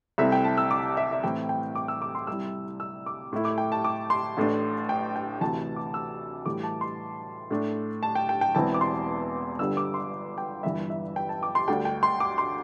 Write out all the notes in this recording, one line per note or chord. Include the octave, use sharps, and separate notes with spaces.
C2 C3 A3 C4 E4 E5
G5
A5
E6
D6
E5
E5
A2 E3 C4 E4 G5
G5
D6
E6
D6
C6
C2 C3 G3 E4 E6
E6
D6
A2 A3 E4
D6
G5
A5
D6
C6
A1 A2 A3 D4
G5
G5
D2 C3 E3 A5
D6
E6
A2 E3 G3 D6
A5
C6
A2 A3 D4
A5
G5
G5
G5
E1 E2 E3 C4 E4 A5
D6
C6
G1 G2 D3 G3 E6
D6
C6
G5
G1 G2 E3 E5
E5
G5
A5
D6
C6
D2 D3 G3 D4 G5
G5
C6
D6
C6